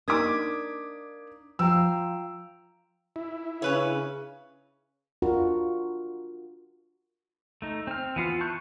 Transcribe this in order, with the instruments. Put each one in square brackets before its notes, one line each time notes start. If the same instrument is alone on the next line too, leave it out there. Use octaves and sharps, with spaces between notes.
[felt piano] A#3 D#4 D6 [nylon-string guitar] D4 [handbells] D#6 G#6 B6
[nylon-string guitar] F3 F5 [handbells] F4 G5 A#5 [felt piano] E6
[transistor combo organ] E4
[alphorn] C#3 [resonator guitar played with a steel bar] C#4 B4 C#5
[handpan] D4 F4 F#4 A#4
[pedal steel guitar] A3 D#4
C4 F6
E3 B3 F4 F6
A5 C#6 F#6 G6